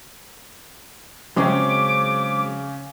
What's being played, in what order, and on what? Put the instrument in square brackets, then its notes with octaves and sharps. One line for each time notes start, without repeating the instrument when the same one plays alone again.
[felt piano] C#3 C#4 [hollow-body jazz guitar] F#3 G#3 C4 [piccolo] D6